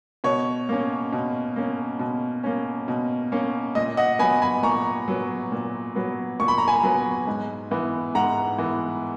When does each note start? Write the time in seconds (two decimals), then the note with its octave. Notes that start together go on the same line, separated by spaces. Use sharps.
0.24 B2 C#5
0.69 A#3 C#4
1.13 B2
1.56 A#3 C#4
1.99 B2
2.44 A#3 C#4
2.88 B2
3.32 A#3 C#4
3.75 A#2 D#5
3.97 D#5 F#5
4.19 B3 G#5 B5
4.23 F#3
4.42 G#5 B5
4.63 A#2 A#5 C#6
5.08 F#3 B3
5.52 A#2
5.95 F#3 B3
6.40 A#2 C#6
6.48 B5
6.58 A#5
6.68 G#5 B5
6.83 F#3 B3
7.28 G#2
7.71 E3 B3
8.15 G#2 F#5 A#5
8.58 E3 B3